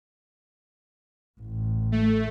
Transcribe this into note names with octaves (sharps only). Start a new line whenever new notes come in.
A1
A3